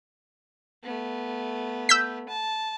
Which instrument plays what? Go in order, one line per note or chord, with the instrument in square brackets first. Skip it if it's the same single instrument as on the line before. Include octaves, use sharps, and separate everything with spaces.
[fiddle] A3 B3
[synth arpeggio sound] E6 G6 B6
[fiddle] A5